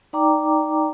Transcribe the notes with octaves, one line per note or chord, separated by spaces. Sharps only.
D#4 D5 G5 A#5 D6